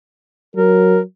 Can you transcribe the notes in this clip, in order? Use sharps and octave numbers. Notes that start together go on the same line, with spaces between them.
F#3 A#4